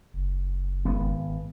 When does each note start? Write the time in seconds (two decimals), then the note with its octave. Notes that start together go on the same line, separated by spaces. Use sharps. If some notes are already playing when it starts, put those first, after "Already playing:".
0.13 F#1
0.85 G#1 B3